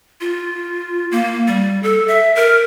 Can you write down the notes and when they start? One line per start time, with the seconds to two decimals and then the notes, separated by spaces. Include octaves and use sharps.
0.21 F4
1.11 A#3
1.47 G3
1.83 A4
2.08 E5
2.35 A#4